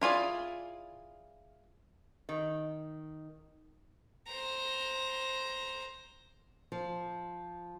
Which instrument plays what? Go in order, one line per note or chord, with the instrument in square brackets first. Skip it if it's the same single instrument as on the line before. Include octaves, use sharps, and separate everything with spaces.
[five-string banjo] E4 F4 G#4 D5
[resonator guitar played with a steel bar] D#3
[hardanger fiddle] C5 A#5
[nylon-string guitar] F3